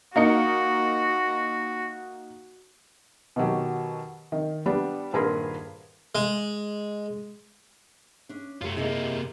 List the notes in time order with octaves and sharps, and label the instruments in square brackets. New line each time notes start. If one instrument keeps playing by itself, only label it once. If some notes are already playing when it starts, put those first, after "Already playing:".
[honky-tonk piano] A#3 D#4 C#7 [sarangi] F#4
[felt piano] B2 D#3 F#3 G4
D#3
G3 B3 D4 G4
D#1 G2 G#4 A#4 B4 C6
[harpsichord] G#3
[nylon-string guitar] C#4 D4
[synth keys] F#2 G4 [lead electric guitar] A3 F4
[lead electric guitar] C3 A#3 [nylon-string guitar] E4 G#4 D#5